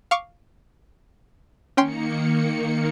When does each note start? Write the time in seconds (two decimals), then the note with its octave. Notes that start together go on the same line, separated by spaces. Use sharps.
0.11 F5 C#6 D6
1.77 D#3 A#3 C#4 G5 C6 C#7